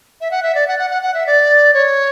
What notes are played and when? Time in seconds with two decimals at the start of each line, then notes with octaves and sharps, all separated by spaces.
0.21 E5
0.31 F#5
0.43 E5
0.55 D5
0.67 F#5
0.79 F#5
0.90 F#5
1.02 F#5
1.14 E5
1.27 D5
1.74 C#5